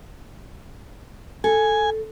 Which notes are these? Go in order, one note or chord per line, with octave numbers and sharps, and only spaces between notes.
A4 G#5